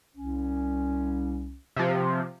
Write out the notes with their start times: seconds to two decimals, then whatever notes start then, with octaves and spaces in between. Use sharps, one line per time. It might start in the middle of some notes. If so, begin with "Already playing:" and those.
0.16 C2 C#4
1.76 C3 F3